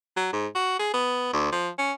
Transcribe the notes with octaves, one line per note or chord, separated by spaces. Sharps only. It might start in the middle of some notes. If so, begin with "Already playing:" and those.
F#3
G#2
F#4
G#4
B3
D2
F3
C#4